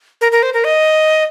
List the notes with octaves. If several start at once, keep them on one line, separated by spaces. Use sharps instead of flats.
A#4
A#4
C5
A#4
D#5